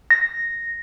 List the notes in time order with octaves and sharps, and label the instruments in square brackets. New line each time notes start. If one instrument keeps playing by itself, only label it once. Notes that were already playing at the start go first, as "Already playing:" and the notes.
[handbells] A#6